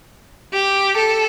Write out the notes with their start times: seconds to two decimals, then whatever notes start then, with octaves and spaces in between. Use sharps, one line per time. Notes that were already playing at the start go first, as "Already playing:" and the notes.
0.54 G4
0.97 A4